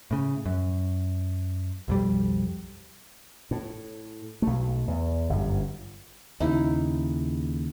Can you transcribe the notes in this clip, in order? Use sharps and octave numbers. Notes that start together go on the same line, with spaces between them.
A2 C#3
F#2
B1 F2 G3
A2
B1 A3
E2
G1 F#2
D#2 C#3 D#4 E4